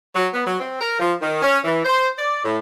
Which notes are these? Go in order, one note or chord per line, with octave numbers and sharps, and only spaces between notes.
F#3
B3
F#3
C4
A#4
F3
D#3
C#4
E3
C5
D5
A2